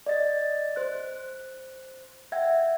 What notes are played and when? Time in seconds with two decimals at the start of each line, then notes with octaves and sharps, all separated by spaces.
0.06 D5 D#5 A6
0.76 C5 F#6
2.32 E5 F#5 G5 G#6